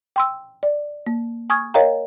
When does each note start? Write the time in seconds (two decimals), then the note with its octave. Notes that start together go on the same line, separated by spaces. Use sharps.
0.16 G5 C6 E6
0.63 D5
1.07 A#3
1.50 G#5 C#6 D#6 F6 G#6
1.74 A#4 C#5 D#5 F5 G5 A#5